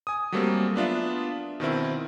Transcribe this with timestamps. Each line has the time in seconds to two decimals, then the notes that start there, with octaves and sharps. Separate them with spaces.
0.07 G#5 D#6
0.32 F#3 G3 A3 A#3 C4
0.76 B3 D4 F4 E5
1.60 B2 D#3 C4 E4